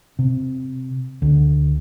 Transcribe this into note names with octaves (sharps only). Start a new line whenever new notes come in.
C3
D2